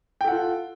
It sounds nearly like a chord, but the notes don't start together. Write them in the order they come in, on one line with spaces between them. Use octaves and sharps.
G5 A4 F#5 F4